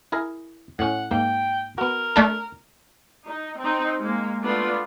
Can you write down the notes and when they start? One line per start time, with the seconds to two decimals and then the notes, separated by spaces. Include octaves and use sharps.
0.12 E4 G#4 A#4
0.79 A2 C#4 F#5
1.11 G#2 A#3 G5
1.78 B3 F#4 A#4
2.16 A3 D4 A4
3.27 D#4
3.60 C4 D#4
4.01 G#3 A#3
4.42 A3 B3 D4 F4